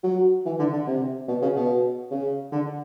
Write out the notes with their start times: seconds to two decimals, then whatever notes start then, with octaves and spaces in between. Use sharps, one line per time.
0.04 F#3
0.46 E3
0.59 D3
0.73 D3
0.87 C3
1.28 B2
1.42 C#3
1.55 B2
2.11 C#3
2.52 D3